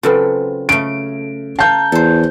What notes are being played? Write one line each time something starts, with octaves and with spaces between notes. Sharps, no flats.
C#3 F#3 C4 F4 A4 B4
C#3 A3 D7
F5 A5 A#5 G6
E2 A4 C5